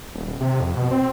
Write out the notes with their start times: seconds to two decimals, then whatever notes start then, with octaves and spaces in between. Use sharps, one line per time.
0.14 D#1
0.26 D#1
0.41 C3
0.60 F2
0.76 B2
0.91 C4